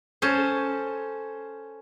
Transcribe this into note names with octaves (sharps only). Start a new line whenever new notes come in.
C#4 A4 C5